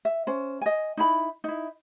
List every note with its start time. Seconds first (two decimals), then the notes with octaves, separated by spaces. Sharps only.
0.05 E5
0.27 C#4 C5
0.61 D#5 G#5
0.97 D#4 E4 B5
1.44 D#4 E4